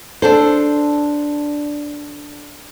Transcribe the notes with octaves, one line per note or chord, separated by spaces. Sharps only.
D4 A4 C5